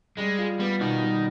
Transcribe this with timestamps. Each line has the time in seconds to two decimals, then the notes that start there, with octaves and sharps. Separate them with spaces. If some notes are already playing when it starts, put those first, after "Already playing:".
0.18 G3 G#3
0.39 F4
0.59 G3 B3
0.81 B2 D#3
1.02 G3